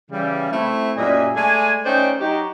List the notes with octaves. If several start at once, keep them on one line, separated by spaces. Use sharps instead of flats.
C#3 E3 G3
A3 C4 E4
F#2 A#2 G3 D#5 E5 G#5
G#3 A3 D5 G#5
A3 C#4 D#4 C5 D5 G5
F#3 D#4 F#4 G4 G5 A#5